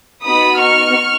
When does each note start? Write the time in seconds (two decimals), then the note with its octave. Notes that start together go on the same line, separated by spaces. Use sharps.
0.25 B3 D#4 F#4 B5 D#6
0.60 C#6 F6